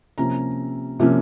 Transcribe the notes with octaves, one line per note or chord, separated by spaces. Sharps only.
C3 F3 A#3 C#4 A#5
C3 F3 A#3 C#4